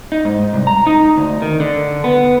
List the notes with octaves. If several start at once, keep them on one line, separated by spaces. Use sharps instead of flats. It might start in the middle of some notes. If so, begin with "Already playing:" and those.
D#4
G#2
C2
A#5
D#4
D2
D#3
D3
B3